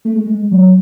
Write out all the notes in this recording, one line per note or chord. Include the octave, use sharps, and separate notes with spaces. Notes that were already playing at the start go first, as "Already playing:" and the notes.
A3
G#3
G#3
F#3